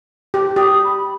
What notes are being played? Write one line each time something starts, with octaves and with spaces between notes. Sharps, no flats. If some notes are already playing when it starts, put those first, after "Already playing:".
G4
G4 D#6
B5